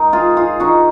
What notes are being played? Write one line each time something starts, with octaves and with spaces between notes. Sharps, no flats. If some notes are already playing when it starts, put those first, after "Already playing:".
Already playing: D#4 A#4
F4 G#4
F4 G#4
D#4 F#4